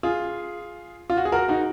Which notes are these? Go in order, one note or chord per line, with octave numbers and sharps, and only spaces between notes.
F4 G#4
F4
F#4
G#4
F#4 A#4
D#4 F#4